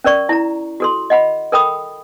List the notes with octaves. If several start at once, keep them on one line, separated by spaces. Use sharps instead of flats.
C#4 A#4 D5 C#6
E4 A#5
F#4 A4 C6
D#5 F#5 B5
A4 A#4 G5 B5 D#6